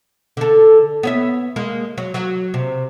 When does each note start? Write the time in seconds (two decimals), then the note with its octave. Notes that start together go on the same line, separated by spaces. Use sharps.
0.37 D3 A4
1.03 B3 C#5 E5
1.56 G#3 A#3
1.98 F#3
2.14 F#3
2.54 C3